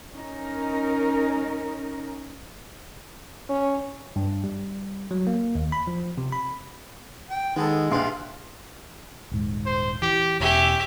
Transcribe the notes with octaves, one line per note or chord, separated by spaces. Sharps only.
C#4 D#4 A#4
C#4
G2
G3
F#3
A#3
D#2
B5
F3
C3
B5
G5
D#3 G#3 B3 D#4 A4
A#1 G4 B4 F5 C6
D#1 G#2
C5
E3 G4
E1 C#4 G4 E5